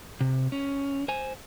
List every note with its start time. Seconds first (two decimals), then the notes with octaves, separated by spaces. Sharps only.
0.21 C3
0.52 C#4
1.08 C5 G#5